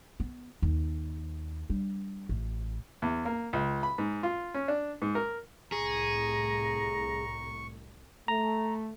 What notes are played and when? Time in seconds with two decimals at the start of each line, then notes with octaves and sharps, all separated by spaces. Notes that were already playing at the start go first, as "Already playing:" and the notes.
0.20 B3
0.62 D#2
1.70 G3 D4
2.29 A1
3.02 E2
3.25 A#3
3.53 C#2
3.83 B5
3.98 G#2
4.23 F4
4.54 C#4
4.68 D4
5.02 G#2
5.15 A#4
5.72 C2 A2 G#4 A#5 C#6
8.28 A3 A#5